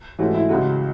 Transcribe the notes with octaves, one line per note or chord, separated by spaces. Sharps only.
G#2 E3 A3 C#4 F#4
E4
C#2 C#3 G#3 F#4